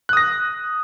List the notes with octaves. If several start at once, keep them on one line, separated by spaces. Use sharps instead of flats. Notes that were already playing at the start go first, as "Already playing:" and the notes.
D#6 F#6 A#6